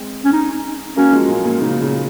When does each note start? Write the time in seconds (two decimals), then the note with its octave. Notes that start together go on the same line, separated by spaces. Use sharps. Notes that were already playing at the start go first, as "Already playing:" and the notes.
Already playing: G#3 C4
0.25 C#4
0.33 D#4
0.96 F#3 A#3 C#4
1.12 F3 G#3
1.28 A#2
1.44 A#2
1.60 A#2 C#3 D#4
1.81 A#2 C#3